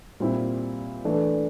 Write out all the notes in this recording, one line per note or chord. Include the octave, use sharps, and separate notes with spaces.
A#2 G3 C4 E4
E3 A3 D4